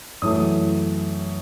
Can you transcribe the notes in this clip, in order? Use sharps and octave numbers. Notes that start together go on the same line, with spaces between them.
F#2 E3 A3 D#6